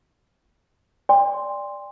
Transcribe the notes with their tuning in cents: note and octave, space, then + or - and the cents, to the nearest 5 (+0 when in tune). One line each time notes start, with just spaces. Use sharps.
D5 +0 G5 +40 C6 +0